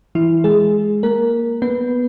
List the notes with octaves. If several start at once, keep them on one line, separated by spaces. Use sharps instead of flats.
E3 E4
G#3 G#4
A#3 A#4
B3 B4